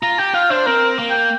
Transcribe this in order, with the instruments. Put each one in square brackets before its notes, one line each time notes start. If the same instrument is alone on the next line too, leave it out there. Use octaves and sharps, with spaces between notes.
[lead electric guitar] F4 [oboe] A#5
[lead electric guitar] G4 [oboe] G5
[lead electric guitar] F4 [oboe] F5
[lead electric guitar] D4 [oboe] C5
[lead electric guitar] C4 [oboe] A#4
[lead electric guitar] A#3
[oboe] G5